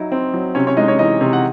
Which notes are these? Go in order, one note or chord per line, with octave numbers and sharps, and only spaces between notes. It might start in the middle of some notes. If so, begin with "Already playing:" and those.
Already playing: F#3 D#4 E4
C4
F#3
C3 C#4 C#5
C#4 C#5
G#3 D#4 D#5
C#4 C#5
E3 D#4 D#5
C3
F#5